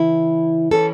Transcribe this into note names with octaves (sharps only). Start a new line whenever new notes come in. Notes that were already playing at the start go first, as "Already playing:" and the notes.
Already playing: C#3 E3 E4
E3 C#4 A4